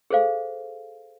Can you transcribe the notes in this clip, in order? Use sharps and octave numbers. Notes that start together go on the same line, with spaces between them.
G#4 A4 C5 F5